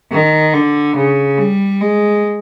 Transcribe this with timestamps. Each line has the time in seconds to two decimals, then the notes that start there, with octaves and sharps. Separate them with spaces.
0.12 D#3
0.54 D3
0.97 C#3
1.38 G3
1.81 G#3